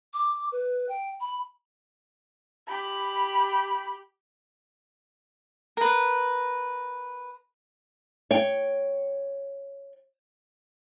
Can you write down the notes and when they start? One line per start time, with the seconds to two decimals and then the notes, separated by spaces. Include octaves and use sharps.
0.13 D6
0.52 B4
0.89 G5
1.20 B5
2.68 G4 B5
5.77 A#4 B4
8.31 C#5 G5